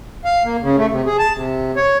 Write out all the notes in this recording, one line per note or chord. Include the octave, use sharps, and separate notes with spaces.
F5
A#3
C#3
A3
C3
G#4
A5
C3
C#5